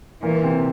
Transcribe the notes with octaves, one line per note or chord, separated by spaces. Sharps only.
A#2 E3 A#3
C3 C4